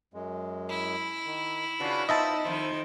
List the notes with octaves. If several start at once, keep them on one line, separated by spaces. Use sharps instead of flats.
F#2 G#3
E4
D#3
C#3 D4 F4 F#4 B4
B3 D#4 F4 C5 D#5 E5 A5
F2 D#3 C5